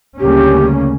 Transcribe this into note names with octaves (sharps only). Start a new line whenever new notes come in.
D2 C#3 G3 A#3 C#4 G4